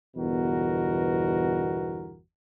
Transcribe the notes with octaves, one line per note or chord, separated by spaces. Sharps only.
G1 E2 B2 F#4 A#4